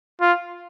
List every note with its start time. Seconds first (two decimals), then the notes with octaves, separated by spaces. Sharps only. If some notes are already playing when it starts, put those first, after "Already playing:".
0.21 F4